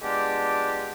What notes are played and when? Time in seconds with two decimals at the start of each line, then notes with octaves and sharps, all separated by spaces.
0.02 G#3 B3 D4 F4 G4